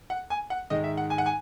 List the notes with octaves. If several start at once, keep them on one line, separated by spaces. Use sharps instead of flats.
F#5
G#5
F#5
G#2 D#3 G#3 D#5
E5
F#5
G#5
F#5
G#5